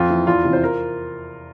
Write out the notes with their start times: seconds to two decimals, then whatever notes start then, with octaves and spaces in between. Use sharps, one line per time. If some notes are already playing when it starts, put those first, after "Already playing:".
Already playing: F2 F4
0.10 E3
0.27 E2 F4
0.44 C3 E3
0.53 C5
0.63 A#4